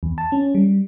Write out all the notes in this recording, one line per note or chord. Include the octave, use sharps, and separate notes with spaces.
E2
A5
C#4
G3